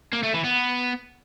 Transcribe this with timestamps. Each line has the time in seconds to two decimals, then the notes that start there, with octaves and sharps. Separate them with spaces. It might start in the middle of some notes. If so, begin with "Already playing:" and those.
0.13 A#3
0.23 A3
0.34 E3
0.44 B3